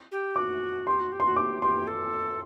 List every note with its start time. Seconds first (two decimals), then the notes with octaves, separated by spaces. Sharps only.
0.11 G4
0.36 F#4 D6
0.86 G4 C6
0.99 F#4
1.11 G4
1.20 F#4 C6
1.36 G4 D6
1.62 G4 C6
1.87 A4